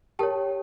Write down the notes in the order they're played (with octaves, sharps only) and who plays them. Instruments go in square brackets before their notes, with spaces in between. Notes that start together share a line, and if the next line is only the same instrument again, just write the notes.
[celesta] G4 A#4 C#5 G5 A5